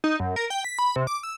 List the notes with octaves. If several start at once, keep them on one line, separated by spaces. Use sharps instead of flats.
D#4
F#2
A#4
G5
B6
B5
C3
D6
E6